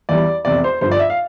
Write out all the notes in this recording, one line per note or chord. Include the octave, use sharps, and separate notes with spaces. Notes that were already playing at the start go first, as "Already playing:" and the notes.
E2 E3 G3 D5
F1 E2 C3 D5
C5
G1 G2 F3 C5
D5
E5
F5